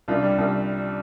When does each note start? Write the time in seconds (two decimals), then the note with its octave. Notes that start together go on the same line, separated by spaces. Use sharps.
0.08 C2 D4 F4
0.23 G3
0.38 C2